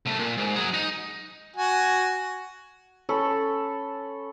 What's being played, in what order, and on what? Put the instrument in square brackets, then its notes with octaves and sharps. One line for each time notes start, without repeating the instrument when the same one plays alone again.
[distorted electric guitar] C2 A3
A#2
G#2
F#3 G#4
D#4
[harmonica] F#4 G#5
[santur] C#4 A4 B5